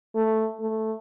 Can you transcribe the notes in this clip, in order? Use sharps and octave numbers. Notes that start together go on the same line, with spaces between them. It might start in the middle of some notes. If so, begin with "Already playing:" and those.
A3
A3